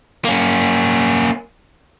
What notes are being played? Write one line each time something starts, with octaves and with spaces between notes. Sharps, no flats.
A#3 C#4